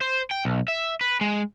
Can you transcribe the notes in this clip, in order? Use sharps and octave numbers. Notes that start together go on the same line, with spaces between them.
C5
G5
B1
E5
B4
G#3